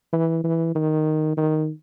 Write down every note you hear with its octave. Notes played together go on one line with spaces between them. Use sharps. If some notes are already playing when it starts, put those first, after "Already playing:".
E3
E3
D#3
D#3